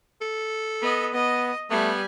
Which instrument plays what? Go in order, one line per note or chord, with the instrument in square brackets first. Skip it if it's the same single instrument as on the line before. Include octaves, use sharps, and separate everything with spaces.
[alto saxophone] A4
[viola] B3 D#5
[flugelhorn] B3 [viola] D#5
[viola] G3 G#5 [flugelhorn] A3 [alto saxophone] B3